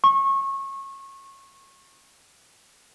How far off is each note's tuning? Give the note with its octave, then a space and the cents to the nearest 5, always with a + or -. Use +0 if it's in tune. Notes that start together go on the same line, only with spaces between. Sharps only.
C#6 -25